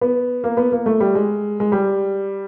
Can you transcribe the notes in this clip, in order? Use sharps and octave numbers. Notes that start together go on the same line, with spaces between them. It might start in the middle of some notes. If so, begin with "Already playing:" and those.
B3
A#3
B3
A#3
A3
G3
G#3
G#3
G3